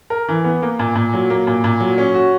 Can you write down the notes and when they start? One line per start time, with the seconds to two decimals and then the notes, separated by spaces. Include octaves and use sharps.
0.10 A#4
0.28 E3
0.44 B3
0.62 A#3
0.79 A#2
0.95 A#2
1.13 F#3
1.30 A#3
1.47 A#2
1.64 A#2
1.80 F#3
1.98 C#4
2.15 F#4